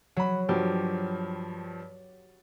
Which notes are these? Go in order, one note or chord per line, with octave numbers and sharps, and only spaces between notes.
F#3 F#5 B5
G2 F3 F#3 G4